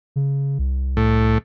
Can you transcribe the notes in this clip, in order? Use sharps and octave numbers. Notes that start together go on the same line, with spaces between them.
C#3
C2
A2